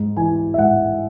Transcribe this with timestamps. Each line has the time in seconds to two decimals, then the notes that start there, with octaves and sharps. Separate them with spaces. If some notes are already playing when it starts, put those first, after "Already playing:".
Already playing: G#2
0.17 E3 G#5
0.54 E5
0.58 G#2 F#5